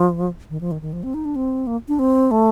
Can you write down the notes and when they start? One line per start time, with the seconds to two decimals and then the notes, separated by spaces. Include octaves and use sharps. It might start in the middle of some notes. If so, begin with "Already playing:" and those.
Already playing: F3
0.50 D#3
0.61 F3
0.71 D#3
0.82 D#3
0.93 F3
1.03 C4
1.14 D#4
1.25 D4
1.36 C4
1.67 A#3
1.88 D4
1.99 C4
2.31 A3